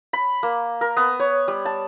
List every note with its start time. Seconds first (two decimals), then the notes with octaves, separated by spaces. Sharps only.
0.13 B5
0.43 A#3
0.81 A#4
0.97 B3
1.20 C#5
1.48 G3
1.65 A5